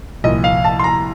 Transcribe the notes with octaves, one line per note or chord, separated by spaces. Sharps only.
C2 A#2 F3 D#5
F5
A5
C6
A#5